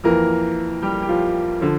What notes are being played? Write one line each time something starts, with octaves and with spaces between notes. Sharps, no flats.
F2 E3 A#3 A#4
G3 G4
G4
F3 F4
D3 F3